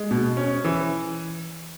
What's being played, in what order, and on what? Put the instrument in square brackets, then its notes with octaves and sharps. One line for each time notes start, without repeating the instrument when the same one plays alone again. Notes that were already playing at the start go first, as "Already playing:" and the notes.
Already playing: [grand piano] G#3
B2
C#4
E3